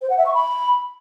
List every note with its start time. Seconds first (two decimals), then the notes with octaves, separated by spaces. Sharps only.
0.02 C5
0.10 F#5
0.18 E5
0.26 C#6
0.34 B5